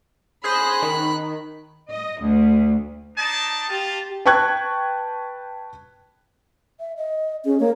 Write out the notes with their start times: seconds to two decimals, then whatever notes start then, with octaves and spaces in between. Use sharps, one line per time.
0.44 G#4 C5 B5 F#6 A#6
0.82 D#3
1.90 D#5
2.21 D2
3.17 D4 D#4 A5
3.69 F4 G4 A5
4.26 B4 G5 A5 C#6 F#6 G#6
6.80 E5
6.97 D#5
7.45 C#4 G#4
7.60 A#3 C#5